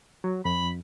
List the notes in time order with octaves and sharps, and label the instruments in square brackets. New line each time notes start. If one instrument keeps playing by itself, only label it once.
[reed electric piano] F#3
[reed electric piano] F2 [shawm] B5